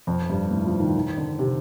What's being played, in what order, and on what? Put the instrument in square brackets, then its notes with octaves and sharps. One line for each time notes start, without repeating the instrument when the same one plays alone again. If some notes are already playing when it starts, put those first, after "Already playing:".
[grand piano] F2
G2
A2
F3
D#3
D#3
D3
C3